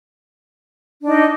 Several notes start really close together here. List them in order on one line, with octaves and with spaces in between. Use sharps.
D4 D#4 D#5